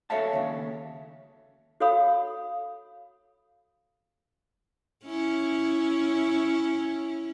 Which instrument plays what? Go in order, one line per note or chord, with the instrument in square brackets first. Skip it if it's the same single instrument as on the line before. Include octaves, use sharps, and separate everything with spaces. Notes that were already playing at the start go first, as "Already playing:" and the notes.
[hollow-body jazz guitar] A4 C#5 E5 F5 A5
D#2 C#3
[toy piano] F#4 A4 C#5 F5 B5 D#6
[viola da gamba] C#4 E4